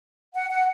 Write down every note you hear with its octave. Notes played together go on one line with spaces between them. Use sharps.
F#5
F#5